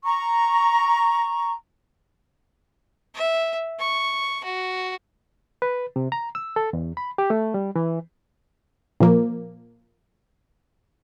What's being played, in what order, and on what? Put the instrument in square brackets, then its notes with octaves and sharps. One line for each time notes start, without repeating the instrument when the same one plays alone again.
[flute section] A#5 C#6
[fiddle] E5
C#6
F#4
[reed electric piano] B4
C3
A#5
E6
A4
E2
B5
G4
A3
G3
E3
[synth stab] A#2 F3 A#3